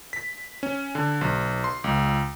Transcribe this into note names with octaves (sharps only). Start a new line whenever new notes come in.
B6
C#4
D3
B1
C6
C#2